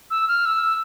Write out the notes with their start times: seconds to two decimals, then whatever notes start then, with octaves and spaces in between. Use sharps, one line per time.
0.11 E6
0.28 F6
0.46 E6